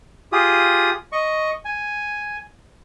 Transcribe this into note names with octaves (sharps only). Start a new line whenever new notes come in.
F4 G4 G#4 D#6
D#5 C#6
G#5